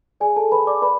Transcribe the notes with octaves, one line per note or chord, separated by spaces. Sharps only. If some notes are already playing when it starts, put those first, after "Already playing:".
G#4 D5 G#5
A4 A5
B4 B5
D5 D6
B4 D5 B5